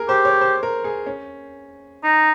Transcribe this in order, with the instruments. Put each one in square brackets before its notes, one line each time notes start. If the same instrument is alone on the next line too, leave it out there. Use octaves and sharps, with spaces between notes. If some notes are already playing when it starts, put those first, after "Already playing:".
Already playing: [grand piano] G#4 A#4
[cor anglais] G4 [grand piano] C5
[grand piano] C#5
C5
A#4
G#4
C#4
[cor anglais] D#4